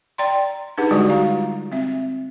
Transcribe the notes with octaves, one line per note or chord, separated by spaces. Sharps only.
D5 G5 A#5 C6
D4 D#4 G4 G#4 B4 F#5
D3 G3 G#3 F#4 G4 D5
G3 F4 F#4 F5 A#5
C4 E5